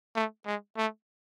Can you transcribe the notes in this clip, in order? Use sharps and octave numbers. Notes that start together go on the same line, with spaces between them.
A3
G#3
A3